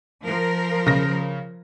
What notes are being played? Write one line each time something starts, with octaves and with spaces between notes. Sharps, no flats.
F3 A#4
C#3 A#6